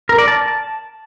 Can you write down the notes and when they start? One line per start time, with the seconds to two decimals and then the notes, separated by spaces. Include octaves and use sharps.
0.09 A#4
0.18 D5
0.28 A5